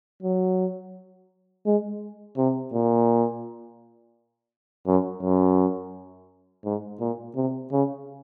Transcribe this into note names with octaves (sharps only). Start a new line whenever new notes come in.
F#3
G#3
C3
A#2
F#2
F#2
G#2
A#2
C3
C#3